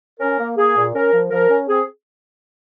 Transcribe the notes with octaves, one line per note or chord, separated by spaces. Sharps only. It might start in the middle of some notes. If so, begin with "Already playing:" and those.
C#4 A#4
A#3
A#3 G#4
A#2
C#4 A#4
F3
F3 A#4
C#4
C4 G#4